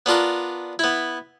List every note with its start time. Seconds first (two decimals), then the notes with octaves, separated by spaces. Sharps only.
0.06 B3 D4 F4 A#4
0.79 B3 E4